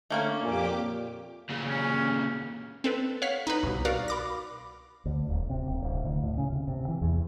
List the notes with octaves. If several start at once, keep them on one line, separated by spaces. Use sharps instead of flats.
D3 A3 A#3 C#4
F2 A#2 G4 D6
A#2 C#3
C#4
C4 A4 B4
C#5 F5 F#5 F6 B6
D#4 B4
C2 B2
F#4 A#4 D5 F5
B5 D6 A#6
D2
D#1
C3
D1
D1
D2
A2
C#3
C3
C3
E3
E2